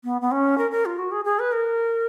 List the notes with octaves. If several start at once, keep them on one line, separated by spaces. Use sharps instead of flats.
B3
B3
C#4
A#4
A#4
F4
F#4
G#4
G#4
B4
A#4